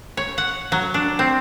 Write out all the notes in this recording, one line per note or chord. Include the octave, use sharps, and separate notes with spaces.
C#5
F#5
F#3
D4
C4